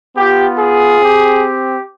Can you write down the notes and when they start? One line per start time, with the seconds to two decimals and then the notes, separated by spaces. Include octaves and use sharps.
0.17 B3 F4 G4
0.59 G#4
1.00 C4 G4